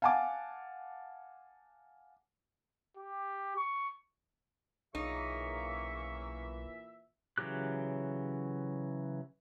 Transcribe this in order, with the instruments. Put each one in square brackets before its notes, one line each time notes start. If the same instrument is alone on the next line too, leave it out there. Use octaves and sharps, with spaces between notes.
[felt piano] F5 F#5 G#5 A5 D6
[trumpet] G4
C#6
[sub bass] B1 [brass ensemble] A#2 E3 E5 [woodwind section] C#3 A#3 C#6 [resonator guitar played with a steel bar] D#4
[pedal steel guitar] C#3 E3 F#3 G4 F#6